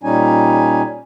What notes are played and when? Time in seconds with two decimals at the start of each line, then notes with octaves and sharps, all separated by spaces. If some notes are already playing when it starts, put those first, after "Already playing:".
0.03 A#2 G3 C#4 D#4 G#5